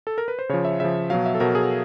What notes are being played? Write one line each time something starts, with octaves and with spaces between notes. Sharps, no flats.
A4
A#4
B4
C5
C#3 F3 C#5
E5
C#3 F3 E5
B2 F#3 F5
E5
A4
B2 F#3 A#4
G#4